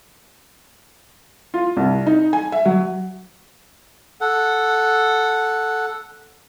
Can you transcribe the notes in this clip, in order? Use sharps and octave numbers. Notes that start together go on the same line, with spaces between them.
F4
C2
D#4
G#5
E5
F#3
A4 F#5